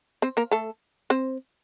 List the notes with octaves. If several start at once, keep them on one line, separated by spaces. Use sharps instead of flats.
C4 C5
A#3 A#4
A3 A4
C4 C5